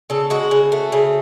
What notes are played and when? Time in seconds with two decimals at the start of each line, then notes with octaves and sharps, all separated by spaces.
0.10 C#3 A4
0.30 G#3 F#4
0.51 C#3
0.72 A3
0.92 C#3